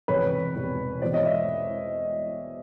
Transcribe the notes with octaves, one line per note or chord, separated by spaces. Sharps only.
E1 E2 C3 B4 C#5
E1 E2 C3
E2 B2 G#3 C5 D5
C#5 D#5
D5 E5